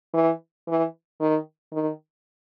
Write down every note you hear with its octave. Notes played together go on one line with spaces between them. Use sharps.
E3
E3
D#3
D#3